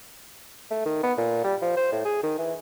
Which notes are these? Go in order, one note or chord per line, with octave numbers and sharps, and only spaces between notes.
A3
D#3
B3
A#2
G3
F3
C5
A2
G#4
D#3
E3